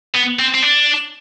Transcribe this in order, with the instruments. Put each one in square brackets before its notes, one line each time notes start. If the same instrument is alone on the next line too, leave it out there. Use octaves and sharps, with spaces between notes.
[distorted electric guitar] B3
C4
C4
D4